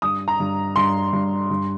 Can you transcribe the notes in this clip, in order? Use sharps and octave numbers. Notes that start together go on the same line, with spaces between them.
G2 D#6
A#5
G2
G2 C6
G2
G2